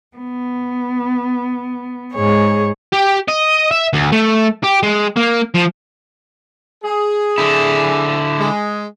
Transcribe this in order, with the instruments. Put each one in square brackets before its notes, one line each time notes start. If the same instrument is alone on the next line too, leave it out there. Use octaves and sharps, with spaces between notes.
[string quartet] B3
G#2 G#4 C#5
[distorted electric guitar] G4
D#5
E5
D2
A3
G4
G#3
A#3
F3
[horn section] G#4
[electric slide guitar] D3 E4
[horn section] G#3